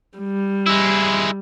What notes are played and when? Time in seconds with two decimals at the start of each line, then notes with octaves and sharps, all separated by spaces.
0.19 G3
0.67 G#3 E4